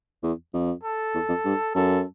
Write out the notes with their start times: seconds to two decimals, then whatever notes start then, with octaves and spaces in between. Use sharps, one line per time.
0.23 E2
0.53 F2
0.83 A4
1.14 E2
1.29 F2
1.45 G2
1.75 F#2 A4